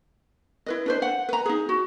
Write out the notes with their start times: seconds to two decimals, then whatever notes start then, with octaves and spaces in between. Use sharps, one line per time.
0.66 E4 B4 D#5
0.86 D4 B4 C5
1.02 F#5
1.29 B4 A#5
1.46 D#4 G#4
1.69 F#4